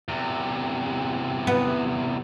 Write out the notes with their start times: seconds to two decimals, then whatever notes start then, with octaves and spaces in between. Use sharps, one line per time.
0.08 E2 C3
1.47 B3